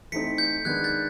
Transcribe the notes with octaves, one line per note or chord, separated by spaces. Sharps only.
E3 A3 C4 D#4 B6 C#7
G6
D#3 G#3 B3 D4 F#6 G#6
G6 A6